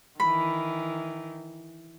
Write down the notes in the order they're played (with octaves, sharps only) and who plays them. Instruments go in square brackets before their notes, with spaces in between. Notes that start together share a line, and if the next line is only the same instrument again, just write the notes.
[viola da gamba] D#3 E3 [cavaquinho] B5